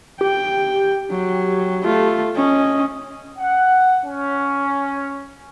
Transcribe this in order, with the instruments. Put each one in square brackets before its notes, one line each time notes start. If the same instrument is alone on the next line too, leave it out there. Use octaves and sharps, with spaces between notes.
[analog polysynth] G4 [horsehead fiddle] G5
[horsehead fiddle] F#3
A3 F4
C#4 D#5
[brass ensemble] F#5
C#4